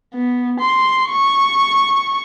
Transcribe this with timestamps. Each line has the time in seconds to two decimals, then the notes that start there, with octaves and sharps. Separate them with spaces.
0.14 B3
0.60 C6
1.10 C#6